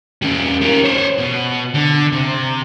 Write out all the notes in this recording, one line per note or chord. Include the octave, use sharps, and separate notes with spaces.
G3 C#4
G4 A#4
C5 C#5
B2
D3
C3